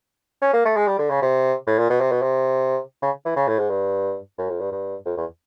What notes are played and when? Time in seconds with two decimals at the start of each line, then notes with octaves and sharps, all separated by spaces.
0.42 C#4
0.53 A#3
0.65 A3
0.76 G#3
0.87 G3
0.99 D3
1.10 C#3
1.22 C3
1.67 A2
1.78 A#2
1.90 B2
2.01 C3
2.12 B2
2.22 C3
3.02 C#3
3.25 E3
3.36 C#3
3.48 A2
3.59 G#2
3.70 G2
4.38 F#2
4.49 F2
4.60 G2
4.72 G2
5.06 F2
5.17 E2